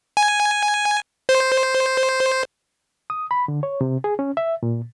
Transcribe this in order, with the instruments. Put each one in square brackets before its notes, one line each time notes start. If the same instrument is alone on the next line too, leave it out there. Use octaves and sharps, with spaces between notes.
[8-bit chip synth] G#5
C5
[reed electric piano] D#6
B5
D3
C#5
C3
G#4
C#4
E5
A#2